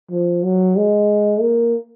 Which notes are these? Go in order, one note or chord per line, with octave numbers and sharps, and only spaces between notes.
F3
F#3
G#3
A#3